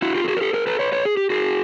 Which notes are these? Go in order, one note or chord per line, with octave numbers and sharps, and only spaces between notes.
E4 F#4
F4 G4
A4
F#4 G#4
A#4
G4 A4
G#4 A#4
A4 B4
B4 C#5
B4 C#5
G#4
G4
F#4 G#4